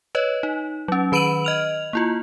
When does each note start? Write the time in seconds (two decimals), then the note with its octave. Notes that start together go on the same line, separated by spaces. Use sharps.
0.15 B4 C#5 D#5
0.43 D#4
0.88 F#3 C#4
1.12 D#3 B4 B5 D7 D#7 F#7
1.45 D#5 F6 F7
1.93 A#3 E4 F4